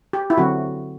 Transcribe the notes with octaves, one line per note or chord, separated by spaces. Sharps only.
G4
E4
D3 F#3 C4 F#4